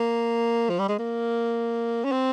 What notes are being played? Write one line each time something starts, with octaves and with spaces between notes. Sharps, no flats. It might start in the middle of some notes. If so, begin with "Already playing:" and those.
Already playing: A#3
F3
G3
G#3
A#3
C#4
C4